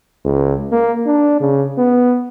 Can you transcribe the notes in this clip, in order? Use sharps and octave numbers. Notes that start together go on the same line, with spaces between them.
C#2
A#3
D4
C#3
B3